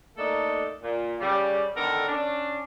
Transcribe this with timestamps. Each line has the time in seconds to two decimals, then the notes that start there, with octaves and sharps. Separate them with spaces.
0.18 A3 A#3 D4 D#4 A4
0.83 A#2
1.20 C#3 G3
1.77 D3 D#3 B3 D4 A4 A#4
2.08 C#4 D4